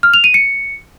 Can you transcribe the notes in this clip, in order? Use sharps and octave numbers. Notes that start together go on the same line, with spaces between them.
F6
F7
D#7
C#7